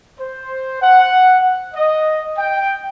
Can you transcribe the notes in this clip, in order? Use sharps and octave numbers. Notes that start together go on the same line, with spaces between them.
C5
F#5
D#5
G5